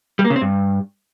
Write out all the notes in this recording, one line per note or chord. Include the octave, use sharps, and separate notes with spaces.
G3
A#3
C#3
C4
G2